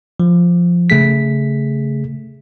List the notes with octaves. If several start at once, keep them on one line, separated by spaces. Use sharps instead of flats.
F3
C#3 A3 G#4 B6